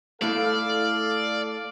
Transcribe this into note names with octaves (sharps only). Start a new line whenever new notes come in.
A3 E4 A4 D5 F5